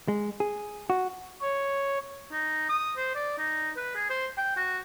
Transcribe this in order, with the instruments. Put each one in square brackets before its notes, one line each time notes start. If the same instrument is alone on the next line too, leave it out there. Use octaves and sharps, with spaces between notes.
[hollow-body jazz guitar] G#3
G#4
F#4
[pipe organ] C#5
[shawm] D#4
D#6
C5
D5
D#4
B4
G#4
C5
G5
F#4